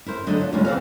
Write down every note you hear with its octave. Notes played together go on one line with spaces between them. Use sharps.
E4 A#4 C5
D3 F#3 D4 D#5
F4
D#2 G3 G#3 C#4 F4 F#4
D#2 E3 C4 F#4 D5 F5